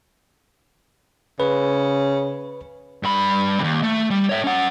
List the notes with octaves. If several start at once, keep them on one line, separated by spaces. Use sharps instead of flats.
C#3 B4
G2 B5
D#2 C3
A3
G3
C#5 E5
C#4 F#5